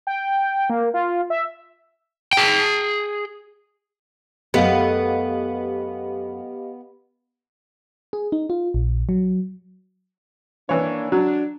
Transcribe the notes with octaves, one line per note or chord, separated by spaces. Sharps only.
G5
A#3
F4
E5
G#4 G5
F#2 A3 B3 G4 D#5 F5
G#4
D#4
F4
A#1
F#3
D#3 E3 A#3 D4 C#5
F#3 D4